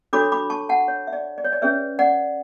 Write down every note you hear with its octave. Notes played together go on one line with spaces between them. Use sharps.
D4 F#4 A4 C#5 B5 D6
B5 D6
A5 C#6
F#5 A5
C#5
E5
D5
D5
C#5
D5
C#4 G#4 B4 C#5 E5
D5 F#5